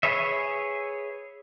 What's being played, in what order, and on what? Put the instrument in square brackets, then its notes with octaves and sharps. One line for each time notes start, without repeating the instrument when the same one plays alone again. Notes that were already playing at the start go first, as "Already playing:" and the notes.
[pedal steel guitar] G#4 B4 C#5 E5